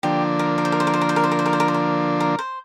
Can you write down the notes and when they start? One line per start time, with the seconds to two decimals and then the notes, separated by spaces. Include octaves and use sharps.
0.03 D3 F3 A#3 D4 G4
0.39 A#4
0.58 A#4
0.65 C5
0.72 A#4
0.80 C5
0.87 A#4
0.94 C5
1.01 A#4
1.09 C5
1.16 A#4
1.24 C5
1.31 A#4
1.39 C5
1.46 A#4
1.53 C5
1.60 A#4
1.68 C5
1.74 A#4
2.20 A#4
2.39 C5